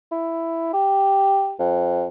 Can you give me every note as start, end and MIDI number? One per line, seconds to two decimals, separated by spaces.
0.12 0.69 64
0.73 1.53 67
1.59 2.05 41